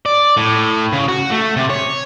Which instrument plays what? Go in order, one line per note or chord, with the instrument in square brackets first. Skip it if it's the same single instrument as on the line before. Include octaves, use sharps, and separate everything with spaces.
[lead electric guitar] D5
A2
C#3
F#4
A3
C3
C#5